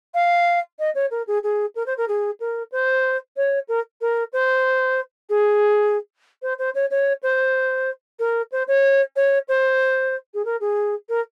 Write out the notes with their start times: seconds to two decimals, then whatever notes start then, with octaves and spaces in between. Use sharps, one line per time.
0.14 F5
0.79 D#5
0.94 C#5
1.10 A#4
1.27 G#4
1.43 G#4
1.75 A#4
1.86 C5
1.97 A#4
2.08 G#4
2.40 A#4
2.71 C5
3.36 C#5
3.68 A#4
4.01 A#4
4.32 C5
5.29 G#4
6.42 C5
6.58 C5
6.74 C#5
6.90 C#5
7.22 C5
8.19 A#4
8.51 C5
8.67 C#5
9.16 C#5
9.48 C5
10.34 G#4
10.45 A#4
10.60 G#4
11.09 A#4